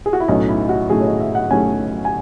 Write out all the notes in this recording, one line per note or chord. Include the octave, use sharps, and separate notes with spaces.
G#4
F#4
E4
B1 A2 F#3 A3 C#4 D#4
E4
F#4
B1 A2 F#3 A3 C#4 G#4
C#5
D#5
E5
F#5
B1 A2 F#3 A3 C#4 G#5
G#5